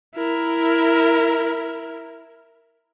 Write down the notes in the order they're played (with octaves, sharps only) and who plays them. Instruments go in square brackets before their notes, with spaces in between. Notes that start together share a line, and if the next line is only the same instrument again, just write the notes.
[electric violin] E4 A#4